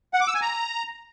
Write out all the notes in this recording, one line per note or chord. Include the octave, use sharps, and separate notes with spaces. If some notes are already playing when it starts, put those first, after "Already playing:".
F#5
D6
E6
G#5
A#5